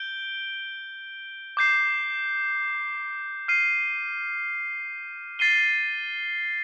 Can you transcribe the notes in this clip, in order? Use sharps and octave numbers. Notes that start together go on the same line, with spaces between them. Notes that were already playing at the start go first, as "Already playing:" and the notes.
Already playing: G6 D7 G7
D6 G6 C7
F6 C7 D#7
A6 C7 D#7 G7